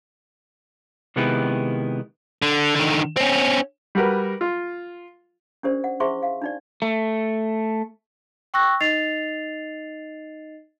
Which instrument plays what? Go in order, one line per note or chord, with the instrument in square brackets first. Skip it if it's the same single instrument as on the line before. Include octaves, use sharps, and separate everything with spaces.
[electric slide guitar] C3 D#3 G#3 B3 E4 G4
[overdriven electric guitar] D3
D3 D#3
C4 C#4
[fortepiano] G3 F#4 A#4 B4
F4
[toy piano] C#4 D4 G4 A#4 C5 D5
F#5
E4 G#4 C5 E5 C6 C#6
F5
D4 D#4 D5
[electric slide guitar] A3
[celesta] G5 C#6 E6 F#6 A#6
D#4 D#5 A6 C7 F7